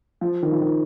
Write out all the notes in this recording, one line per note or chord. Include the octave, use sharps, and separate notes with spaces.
F3
D#3
F3
D#3